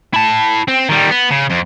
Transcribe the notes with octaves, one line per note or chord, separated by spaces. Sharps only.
E4 A5
C4
D#3 G3
B3
C#3
F2